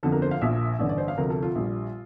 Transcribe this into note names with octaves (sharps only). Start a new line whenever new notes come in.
G1 F2 D3 F3 A4
A#4
C5
F5
A#1 A#2 F3 E5
A1 G2 D3 D5
D5
C5
F5
D2 C3 F3 A#4
A4
F4
A#1 A#2 G3